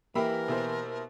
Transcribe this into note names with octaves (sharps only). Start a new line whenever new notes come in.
E3 A#3 G4 A#4 E5 B5
B2 E4 C5